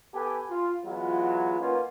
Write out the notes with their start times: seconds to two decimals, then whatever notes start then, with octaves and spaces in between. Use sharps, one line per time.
0.14 B3 G4 A4 B4 G#5
0.50 F4
0.85 E3 F#3 G#3 B3 F4
1.60 A#3 C#4 D#4 F4 B4 F#5